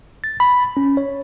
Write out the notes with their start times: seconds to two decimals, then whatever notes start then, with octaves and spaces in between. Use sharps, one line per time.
0.24 A6
0.40 B5
0.77 C#4
0.97 C#5